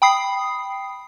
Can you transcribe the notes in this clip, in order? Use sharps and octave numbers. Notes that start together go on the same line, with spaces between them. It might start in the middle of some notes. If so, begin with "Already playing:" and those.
G5 B5 D#6 C7